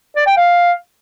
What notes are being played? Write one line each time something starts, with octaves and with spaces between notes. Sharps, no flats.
D5
G5
F5